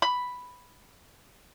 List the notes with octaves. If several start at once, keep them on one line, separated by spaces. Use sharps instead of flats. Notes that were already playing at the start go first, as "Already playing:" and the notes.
B5